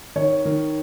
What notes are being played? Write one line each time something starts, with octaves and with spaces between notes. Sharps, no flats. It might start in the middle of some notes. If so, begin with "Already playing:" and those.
D#3 C#5
D#3